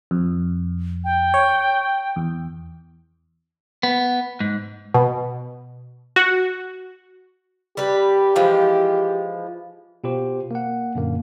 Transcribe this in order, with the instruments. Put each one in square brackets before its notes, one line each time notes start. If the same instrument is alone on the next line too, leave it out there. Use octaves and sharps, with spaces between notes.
[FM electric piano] F2
[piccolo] G5
[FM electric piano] C#5
E2
[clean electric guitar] B3
G#2
[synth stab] B2
F#4
[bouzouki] G3 B4 [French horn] G4
[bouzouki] E3 F3 G#3
[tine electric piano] B2 F4 G4 C5
A#3 F#5
F#2 A#2 D3 A#3